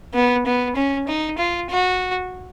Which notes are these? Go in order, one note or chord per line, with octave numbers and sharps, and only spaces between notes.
B3
B3
C#4
D#4
F4
F#4